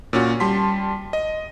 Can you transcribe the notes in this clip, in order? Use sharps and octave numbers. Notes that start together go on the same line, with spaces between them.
A#2 C#4 F#4
G3 A5 C6 B6
D#5